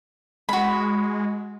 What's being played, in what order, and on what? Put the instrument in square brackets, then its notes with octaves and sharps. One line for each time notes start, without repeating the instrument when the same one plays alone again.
[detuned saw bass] G#3 [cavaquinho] F#4 B5